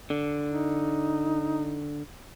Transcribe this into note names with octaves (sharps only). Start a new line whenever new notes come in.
D3
D#4